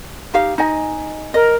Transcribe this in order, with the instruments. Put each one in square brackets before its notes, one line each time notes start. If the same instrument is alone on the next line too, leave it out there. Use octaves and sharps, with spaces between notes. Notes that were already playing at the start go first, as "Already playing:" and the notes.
[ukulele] D#4 G4 F5
D#4 D#5 G#5
[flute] A#4 [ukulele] D#5